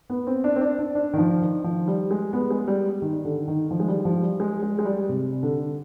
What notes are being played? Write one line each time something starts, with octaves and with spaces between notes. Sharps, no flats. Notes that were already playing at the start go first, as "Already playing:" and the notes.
B3
C4
D4
C4
D4
D4
D4
D#3
F3
D#3
F3
G3
G#3
B3
G#3
G3
D#3
D3
D#3
F3
G#3
G3
F3
G3
G#3
G#3
G#3
G3
C3
D3